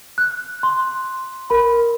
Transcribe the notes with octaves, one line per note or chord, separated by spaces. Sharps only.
F#6
C6
A#4 B5